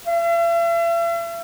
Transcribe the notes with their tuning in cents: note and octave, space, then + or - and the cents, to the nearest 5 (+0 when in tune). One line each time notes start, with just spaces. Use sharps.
E5 +45